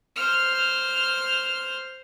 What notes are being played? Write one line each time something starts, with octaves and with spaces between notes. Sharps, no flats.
C5 F6